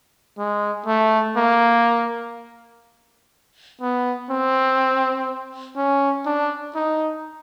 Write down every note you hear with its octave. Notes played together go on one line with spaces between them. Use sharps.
G#3
A3
A#3
B3
C4
C#4
D4
D#4